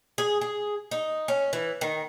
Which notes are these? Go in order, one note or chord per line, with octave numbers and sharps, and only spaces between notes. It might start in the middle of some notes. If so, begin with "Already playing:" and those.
G#4
G#4
D#4
C#4
E3
D#3